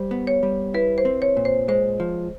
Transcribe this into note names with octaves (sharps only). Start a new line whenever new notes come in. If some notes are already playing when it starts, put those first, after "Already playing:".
Already playing: G3 C5
B3
C#5
G3
E4 B4
C5
C4
C#5
A#2
C5
G#3 C5
F3